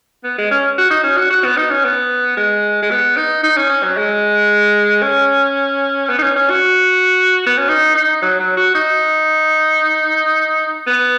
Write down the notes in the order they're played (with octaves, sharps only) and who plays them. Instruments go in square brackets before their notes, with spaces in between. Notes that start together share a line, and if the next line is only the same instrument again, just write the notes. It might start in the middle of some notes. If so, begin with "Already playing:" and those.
[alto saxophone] B3
G#3
C#4
F#4
D#4
C#4
F#4
F#4
B3
D#4
C#4
B3
G#3
G#3
B3
D#4
D#4
C#4
C#4
F#3
G#3
C#4
B3
D#4
C#4
C#4
F#4
B3
C#4
D#4
D#4
F#3
F#3
F#4
D#4
B3